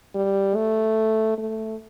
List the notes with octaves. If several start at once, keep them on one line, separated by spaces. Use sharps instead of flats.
G3
A3
A3